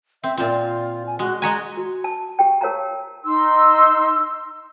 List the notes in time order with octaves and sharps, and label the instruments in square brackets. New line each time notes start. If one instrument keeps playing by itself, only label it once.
[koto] C4 [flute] E5
[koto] A#2 C4 [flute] F4
[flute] G#5
[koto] G#3 [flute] F#4
[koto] G#3 F#4 G#5 [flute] A#5
[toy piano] F#4
A5
G4 G5
G4 A#4 C#5 F5 A5 A#5
[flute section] D#4 C6 E6